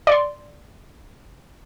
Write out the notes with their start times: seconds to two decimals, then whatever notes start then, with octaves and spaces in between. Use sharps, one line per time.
0.07 D5 C6